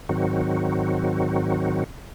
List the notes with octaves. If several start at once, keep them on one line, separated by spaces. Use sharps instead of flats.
G#2 D#3 F#3 C4 F#4